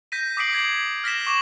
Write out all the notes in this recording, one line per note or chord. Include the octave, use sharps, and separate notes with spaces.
G6 A#6 B6 D#7
D6 D#6 B6 C7 D7 F#7
G#6 F#7
F6 A#6 B6 E7
C#6 D6 E7 F#7